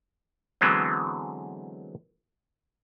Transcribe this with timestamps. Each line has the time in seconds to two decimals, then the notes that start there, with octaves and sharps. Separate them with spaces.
0.61 D3 E3 F#3 G#3 B3 C4